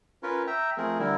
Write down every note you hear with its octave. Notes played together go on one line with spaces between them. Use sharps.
C#4 F4 A#4 B4 C#5
E5 G5 A#5
F3 A3 C4 G#4 A#4
D3 G3 E4 A#4